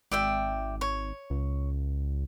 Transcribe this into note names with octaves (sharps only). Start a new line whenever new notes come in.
G#1 D5 E5 G5
C#5
C#2